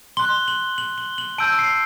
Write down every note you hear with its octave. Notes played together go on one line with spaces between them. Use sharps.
C6 F#6 G7
F#7
F#7
G7
F#7
A5 E6 G6 D7
C7